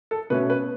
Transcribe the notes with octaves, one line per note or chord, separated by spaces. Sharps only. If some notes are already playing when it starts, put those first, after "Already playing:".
A4
B2 A3 C#4 B4
B4